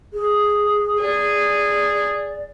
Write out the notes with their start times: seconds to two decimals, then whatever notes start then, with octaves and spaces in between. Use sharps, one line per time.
0.13 G#4
1.02 G#4 D5